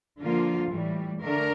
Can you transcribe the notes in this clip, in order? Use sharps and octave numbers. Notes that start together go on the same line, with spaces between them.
D3 F3 A#3 F4
A2 E3 G3
D3 A3 D4 A#4